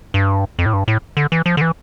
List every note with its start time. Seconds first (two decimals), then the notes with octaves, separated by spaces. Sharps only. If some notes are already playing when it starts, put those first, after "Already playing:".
0.14 G2
0.59 F2
0.66 A2
0.74 G2
0.88 A2
1.17 D3
1.32 E3
1.46 F3
1.57 D3
1.61 E3